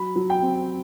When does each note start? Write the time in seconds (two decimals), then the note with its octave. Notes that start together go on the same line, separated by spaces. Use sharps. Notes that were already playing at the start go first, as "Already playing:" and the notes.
Already playing: F#3 B5
0.16 F#3
0.30 G5
0.42 C4